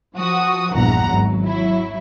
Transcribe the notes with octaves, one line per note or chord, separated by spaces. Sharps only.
F3 F#4 D#6
A#1 E2 G2 F#5 A#5
G#1 F#3
F#3 E4